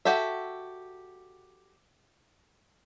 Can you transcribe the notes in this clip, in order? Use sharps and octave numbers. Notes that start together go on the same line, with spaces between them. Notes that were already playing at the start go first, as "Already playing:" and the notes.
F#4 G4 A4 E5